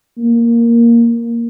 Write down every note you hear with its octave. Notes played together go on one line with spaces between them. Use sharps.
A#3